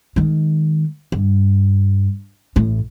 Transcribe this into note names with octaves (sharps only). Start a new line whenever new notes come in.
D#3 G#3
G2
A1 A2